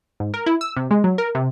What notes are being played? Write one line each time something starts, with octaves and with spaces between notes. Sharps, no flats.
G#2
A#4
E4
E6
C3
G#3
F#3
A#4
C3